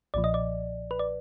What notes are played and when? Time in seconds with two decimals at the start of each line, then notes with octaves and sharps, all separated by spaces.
0.14 B1 A#2 F3 D5
0.24 D#5
0.34 D5
0.91 B4
0.99 D5